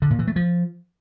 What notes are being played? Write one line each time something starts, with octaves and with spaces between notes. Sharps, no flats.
D3
A#2
E3
A3
F3